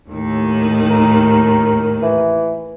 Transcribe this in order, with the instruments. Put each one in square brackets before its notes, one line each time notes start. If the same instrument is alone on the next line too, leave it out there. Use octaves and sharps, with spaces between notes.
[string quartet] D#2 A2 D#3
[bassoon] A#4
E3